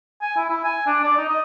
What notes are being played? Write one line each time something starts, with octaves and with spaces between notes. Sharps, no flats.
G#5
E4
E4
G#5
D4
D5
D#4
D#5